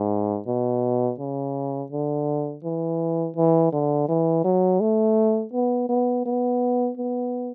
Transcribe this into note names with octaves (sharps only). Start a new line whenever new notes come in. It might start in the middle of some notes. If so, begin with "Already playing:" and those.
Already playing: G#2
B2
C#3
D3
E3
E3
D3
E3
F#3
A3
B3
B3
B3
B3